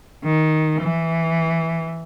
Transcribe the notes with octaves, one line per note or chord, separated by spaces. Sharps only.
D#3
E3